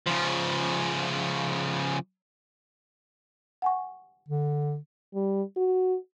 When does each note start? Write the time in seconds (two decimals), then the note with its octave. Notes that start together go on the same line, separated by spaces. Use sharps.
0.06 C#3 F3
3.62 F#5 G#5 C#6
4.29 D3
5.15 G3
5.57 F#4